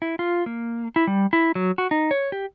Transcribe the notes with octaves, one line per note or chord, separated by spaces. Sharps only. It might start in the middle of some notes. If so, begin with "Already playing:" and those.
E4
F4
A#3
E4
G3
E4
F#3
F#4
D#4
C#5
G4